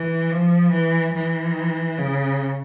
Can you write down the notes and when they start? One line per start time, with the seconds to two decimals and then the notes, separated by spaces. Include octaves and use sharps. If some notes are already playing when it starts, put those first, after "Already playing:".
Already playing: E3
0.32 F3
0.73 E3
1.15 E3
1.98 C#3